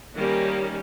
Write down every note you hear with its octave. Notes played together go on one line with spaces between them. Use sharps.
D#3 G3 A#3 C#4